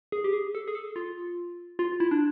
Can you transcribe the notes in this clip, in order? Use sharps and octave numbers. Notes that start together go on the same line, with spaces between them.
G#4
G4
G#4
A4
G#4
A4
F4
F4
E4
D4